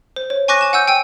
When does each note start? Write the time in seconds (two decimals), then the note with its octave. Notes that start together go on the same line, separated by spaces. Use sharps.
0.16 C5
0.30 C#5
0.48 G#5 C#6 D6 F#6 A#6
0.61 G#5 E7
0.73 F#5 G#5 E6 G6
0.88 G5 G#5 E6